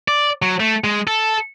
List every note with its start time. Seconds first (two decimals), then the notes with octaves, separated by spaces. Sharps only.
0.08 D5
0.42 F#3
0.60 A3
0.84 G#3
1.07 A4